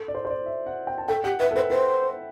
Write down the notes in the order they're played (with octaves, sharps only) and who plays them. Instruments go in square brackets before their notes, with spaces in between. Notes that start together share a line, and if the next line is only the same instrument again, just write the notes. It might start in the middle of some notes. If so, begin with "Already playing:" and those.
Already playing: [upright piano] A4
D5
C5
C5
D5
E5
F#5
G5
A5
[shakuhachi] A4 [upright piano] G5
[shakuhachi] G4 [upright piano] F#5
[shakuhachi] B4 [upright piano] E5
[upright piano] A4
[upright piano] B4 [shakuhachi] C5
[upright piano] B4 [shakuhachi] C5